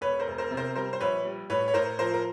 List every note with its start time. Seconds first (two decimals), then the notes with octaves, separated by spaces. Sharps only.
0.01 E1 B4 C#5
0.20 A#4 C5
0.27 E1
0.38 A#4 C5
0.51 C3
0.57 A#4 C5
0.75 G3 A#4 C5
0.93 C5
1.00 A#1 B4 C#5
1.25 G3
1.50 A2 B4 C#5
1.68 C#5
1.74 A2 A#4 C5
1.98 F3 A#4 C5
2.14 A#4